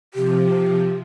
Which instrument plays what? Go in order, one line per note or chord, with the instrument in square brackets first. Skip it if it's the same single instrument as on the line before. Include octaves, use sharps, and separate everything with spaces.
[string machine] C3 F3 [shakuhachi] G4